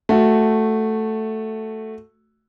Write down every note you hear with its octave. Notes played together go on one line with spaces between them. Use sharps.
A3 F#4